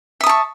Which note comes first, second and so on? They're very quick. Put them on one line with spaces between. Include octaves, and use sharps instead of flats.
E5 D#6 A5 C#6